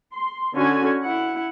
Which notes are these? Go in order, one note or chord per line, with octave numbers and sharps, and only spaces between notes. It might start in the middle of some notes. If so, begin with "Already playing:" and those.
C6
D3 C#4 F#4 G#5
E4 F#5